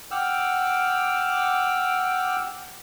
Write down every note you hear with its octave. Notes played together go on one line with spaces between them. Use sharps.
F#5 G5 D6 E6 F6